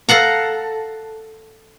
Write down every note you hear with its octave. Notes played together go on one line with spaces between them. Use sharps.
A4 F5 F#5 A#5